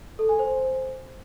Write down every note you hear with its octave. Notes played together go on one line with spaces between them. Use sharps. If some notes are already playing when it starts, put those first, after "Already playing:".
A4
G#5
C5